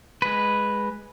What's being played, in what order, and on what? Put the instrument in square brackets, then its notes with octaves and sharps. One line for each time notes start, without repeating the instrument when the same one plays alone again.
[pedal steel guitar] G#3 B4